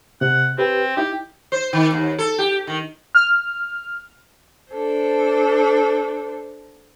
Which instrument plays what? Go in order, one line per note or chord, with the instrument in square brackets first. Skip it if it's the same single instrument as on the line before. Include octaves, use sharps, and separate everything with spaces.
[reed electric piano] C3 [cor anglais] F#5
[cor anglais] C4 [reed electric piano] G4 B4
[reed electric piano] D#4 E4 [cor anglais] G4
[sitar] C5
D#3
D#2
A4
G4
D#3
[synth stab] F6
[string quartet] D4 A4 C5